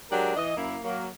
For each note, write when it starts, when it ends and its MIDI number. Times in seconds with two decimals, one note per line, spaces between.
0.11 0.33 54
0.11 0.33 56
0.11 0.33 62
0.11 0.33 67
0.11 0.33 70
0.36 0.55 52
0.36 0.55 75
0.57 0.77 42
0.57 0.77 58
0.57 0.77 64
0.83 1.07 54
0.83 1.07 58